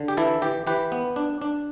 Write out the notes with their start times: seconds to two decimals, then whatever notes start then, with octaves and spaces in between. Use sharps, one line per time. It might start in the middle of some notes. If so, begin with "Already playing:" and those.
Already playing: D3
0.08 G4
0.17 E3 E4 A4
0.42 E3 G4
0.67 E3 G4 B4
0.92 B3
1.16 D4
1.42 D4